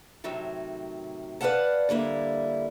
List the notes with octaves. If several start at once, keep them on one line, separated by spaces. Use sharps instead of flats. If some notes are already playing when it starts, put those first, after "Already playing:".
A2 C3 D#3 F#3
B4 C#5 D5 F5 F#5 A5
D3 G3 A#3 E4